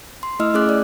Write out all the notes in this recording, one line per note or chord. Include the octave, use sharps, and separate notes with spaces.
C6
A3 E4 D#5 E6 F6
A3 C#4 G#4 D6 F#6
D5